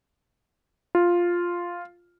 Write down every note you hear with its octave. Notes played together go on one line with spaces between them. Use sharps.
F4